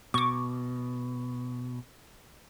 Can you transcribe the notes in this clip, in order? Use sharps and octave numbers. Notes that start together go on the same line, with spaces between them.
B2 C#6 D6